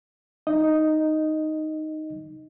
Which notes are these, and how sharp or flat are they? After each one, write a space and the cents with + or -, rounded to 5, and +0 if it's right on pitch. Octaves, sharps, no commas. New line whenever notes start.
D#4 -5 D#5 +0